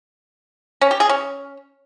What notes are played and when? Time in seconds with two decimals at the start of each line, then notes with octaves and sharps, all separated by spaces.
0.81 C#4
0.91 G4
1.00 G#4
1.09 C#4